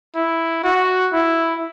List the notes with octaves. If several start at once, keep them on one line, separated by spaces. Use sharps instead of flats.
E4
F#4
E4